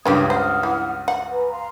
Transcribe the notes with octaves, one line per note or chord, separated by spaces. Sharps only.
C#2 G2 C#4 D4 G4 D#6 G#6
C5 F#5 D#6 F6
E3
F#5
B4 G#5 A#5
F5 A#5 C6